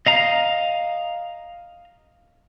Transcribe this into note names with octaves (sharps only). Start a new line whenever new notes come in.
D#5 F5 A#5